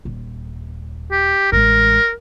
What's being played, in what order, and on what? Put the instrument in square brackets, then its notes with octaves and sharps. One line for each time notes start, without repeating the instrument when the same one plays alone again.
[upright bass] D#1
[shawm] G4
[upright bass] A1 G#3 [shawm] A#4